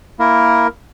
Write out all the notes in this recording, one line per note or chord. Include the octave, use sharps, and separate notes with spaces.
A#3 E4 A#4